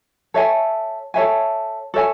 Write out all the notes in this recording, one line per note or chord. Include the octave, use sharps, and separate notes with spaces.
A4 C#5 E5 G#5
A4 C#5 E5 G#5
A4 C#5 E5 G#5